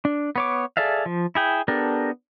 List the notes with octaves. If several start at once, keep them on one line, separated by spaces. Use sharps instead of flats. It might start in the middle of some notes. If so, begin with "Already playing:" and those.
D4
B3 C#5 D6
G#4 A4 D5 E5 F5
F3
E4 G#4 G5
B3 D4 G4 A4 A#4